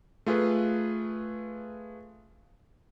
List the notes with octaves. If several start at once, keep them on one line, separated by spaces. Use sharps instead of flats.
A3 F4 G#4 B4